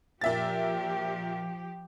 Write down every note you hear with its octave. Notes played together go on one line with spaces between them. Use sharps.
A#2 F3 G4 E5 A6